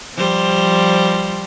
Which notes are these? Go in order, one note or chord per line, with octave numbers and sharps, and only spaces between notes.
F3 G3 C5